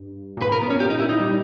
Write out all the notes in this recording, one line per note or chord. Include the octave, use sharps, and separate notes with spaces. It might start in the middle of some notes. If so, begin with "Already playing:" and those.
Already playing: G2
A#2
G#2 B4
A#4
B3
A#2 C#4
A#2 G4
D#4
E4
D#4
G3